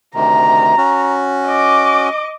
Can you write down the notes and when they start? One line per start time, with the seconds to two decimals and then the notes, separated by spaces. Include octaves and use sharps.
0.15 D2 C3 D#3 A#5
0.78 C#4 F#4
1.46 D#5 D6